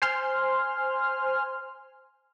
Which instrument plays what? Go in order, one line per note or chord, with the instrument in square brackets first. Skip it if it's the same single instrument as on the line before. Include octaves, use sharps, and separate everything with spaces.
[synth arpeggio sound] C5 G#5 C6 F6